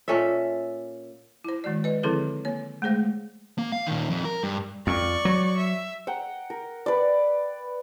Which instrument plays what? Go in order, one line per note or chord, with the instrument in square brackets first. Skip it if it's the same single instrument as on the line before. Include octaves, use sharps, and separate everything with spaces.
[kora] A#2 C#4 A4 E5
[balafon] E4 C5
D#3 G#3 F#4 D5
B4 D#5
D3 F3 C4 E4 G#4 A4
A#3 C#5
G#3 A3 G#4 C5 F5
[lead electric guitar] A#3
F5
A#2 D#3
F2
A#4
G2
[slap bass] F2 [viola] D5 C#6
[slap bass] F#3
[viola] E5
[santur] F#5 G5 A#5
A#4
B4 D5